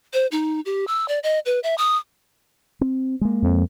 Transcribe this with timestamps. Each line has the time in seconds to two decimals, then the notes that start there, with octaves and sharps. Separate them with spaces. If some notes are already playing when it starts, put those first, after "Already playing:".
0.14 C5
0.32 D#4
0.66 G4
0.88 E6
1.08 D5
1.23 D#5
1.46 B4
1.63 E5
1.78 D#6
2.81 C4
3.21 G#3 A#3
3.43 F2